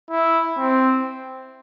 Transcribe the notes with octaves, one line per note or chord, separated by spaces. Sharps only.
E4
C4